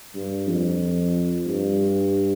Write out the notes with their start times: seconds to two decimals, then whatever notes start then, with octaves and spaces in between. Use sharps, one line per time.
0.15 G2
0.47 F2
1.46 G2